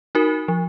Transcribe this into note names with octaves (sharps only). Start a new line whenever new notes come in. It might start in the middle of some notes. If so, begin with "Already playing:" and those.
D#4 F#4 A#4
F3